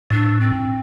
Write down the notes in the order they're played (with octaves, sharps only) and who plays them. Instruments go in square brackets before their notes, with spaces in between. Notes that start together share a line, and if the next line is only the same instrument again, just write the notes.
[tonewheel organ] A2 [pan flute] D4
[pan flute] C4